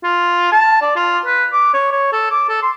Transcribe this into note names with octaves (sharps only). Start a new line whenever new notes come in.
F4
A5
D5
F4
B4
D6
C#5
C#5
A4
D6
A4
C6